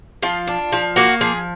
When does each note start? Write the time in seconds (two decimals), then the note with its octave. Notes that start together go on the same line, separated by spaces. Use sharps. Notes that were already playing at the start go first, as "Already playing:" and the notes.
0.23 F3 F4
0.47 D4
0.72 F3
0.96 A#3 F#4
1.21 F3 G#4